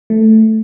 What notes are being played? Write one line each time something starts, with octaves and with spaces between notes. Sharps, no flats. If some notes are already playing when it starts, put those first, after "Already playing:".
A3